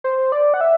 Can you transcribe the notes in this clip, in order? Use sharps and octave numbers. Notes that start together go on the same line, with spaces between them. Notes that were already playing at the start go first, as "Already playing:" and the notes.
C5
D5
F#5
E5